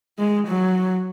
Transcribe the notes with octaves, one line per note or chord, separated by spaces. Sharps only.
G#3
F#3